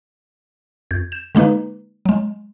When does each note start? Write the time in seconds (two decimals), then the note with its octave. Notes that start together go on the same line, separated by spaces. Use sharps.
0.91 F2 G6 G#6
1.12 G6 E7
1.35 D3 G#3 A#3 D#4 B4
2.06 F#3 G#3